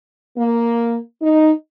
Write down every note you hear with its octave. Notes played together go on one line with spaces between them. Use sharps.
A#3
D#4